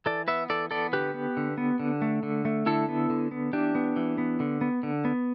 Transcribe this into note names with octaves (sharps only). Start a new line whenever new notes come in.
E3 A4 D5
B3 B4 E5
E3 A4 D5
B3 A4 D5
D3 G4 B4
B3
D3
B3
D3
A3
D3
A3
D3 E4 A4
B3
D3
B3
E3 D4 G4
B3
E3
B3
D3
B3
D3
B3